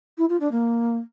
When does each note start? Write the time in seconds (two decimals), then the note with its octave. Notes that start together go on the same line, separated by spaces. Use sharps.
0.18 E4
0.29 F4
0.40 D4
0.51 A#3